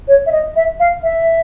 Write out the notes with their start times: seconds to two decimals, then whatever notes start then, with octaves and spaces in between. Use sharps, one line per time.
0.08 C#5
0.26 E5
0.32 D#5
0.56 E5
0.80 F5
1.03 E5